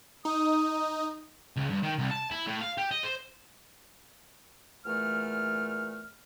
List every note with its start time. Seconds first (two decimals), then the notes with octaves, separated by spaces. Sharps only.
0.25 D#4 D#6
1.57 C#2
1.70 G2
1.83 D#3
1.99 C2
2.11 A5
2.31 E4
2.47 A2
2.61 F5
2.78 G4
2.91 D#5
3.03 C5
4.85 E2 A#2 A3 F6